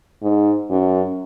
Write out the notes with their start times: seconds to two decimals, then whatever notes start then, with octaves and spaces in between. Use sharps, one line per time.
0.22 G#2
0.70 F#2